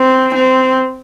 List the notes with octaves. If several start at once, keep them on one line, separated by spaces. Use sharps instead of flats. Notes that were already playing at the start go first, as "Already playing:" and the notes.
Already playing: C4
C4